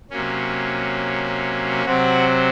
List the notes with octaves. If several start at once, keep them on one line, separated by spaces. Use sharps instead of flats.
C3 F#3 A#3 C#4
C3 F#3 C4 F#4